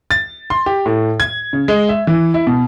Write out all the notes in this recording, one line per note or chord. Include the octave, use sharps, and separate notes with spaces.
A6
C6
G4
A2
G#6
C#3
G#3
E5
E3
E4
B2